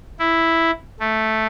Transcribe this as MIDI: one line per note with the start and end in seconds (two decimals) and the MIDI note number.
0.19 0.71 64
1.00 1.47 57